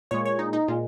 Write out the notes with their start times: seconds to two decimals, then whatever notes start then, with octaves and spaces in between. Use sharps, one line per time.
0.11 A#2 G#3 C#5
0.25 C#5
0.39 D#4
0.53 D#4
0.68 A#2 G#3 F4